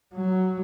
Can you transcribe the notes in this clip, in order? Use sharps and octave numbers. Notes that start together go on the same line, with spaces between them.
F#3